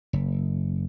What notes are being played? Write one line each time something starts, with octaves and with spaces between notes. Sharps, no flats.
F#1